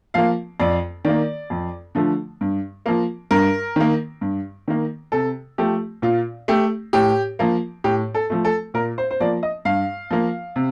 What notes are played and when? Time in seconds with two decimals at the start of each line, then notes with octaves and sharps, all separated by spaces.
0.14 F3 A#3 F5
0.60 F2 D5
1.05 D#3 A#3 D5
1.50 F2
1.95 D3 F3 A3
2.41 G2
2.86 F3 A#3
3.31 G2 A#4
3.76 D#3 A#3
4.21 G2
4.68 D#3 A#3
5.12 C3 A4
5.58 F3 A3 G4
6.02 A#2 F4
6.48 A3 G4
6.93 A2 G4
7.39 F3 A#3
7.84 A2 G4
8.14 A4
8.30 F3 A3
8.45 A4
8.74 A#2 A#4
8.98 C5
9.11 C5
9.20 F3 A#3 D5
9.43 D#5
9.65 G2 F5
10.11 F3 A#3
10.56 C3